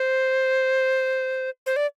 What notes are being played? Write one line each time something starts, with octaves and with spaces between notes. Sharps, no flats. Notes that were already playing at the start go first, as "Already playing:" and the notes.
Already playing: C5
C5
D5